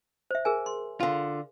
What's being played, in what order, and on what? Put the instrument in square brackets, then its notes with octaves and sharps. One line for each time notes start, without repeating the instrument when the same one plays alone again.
[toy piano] C5 E5
G#4 A#4 G#5
C6
[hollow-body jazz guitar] D3 F4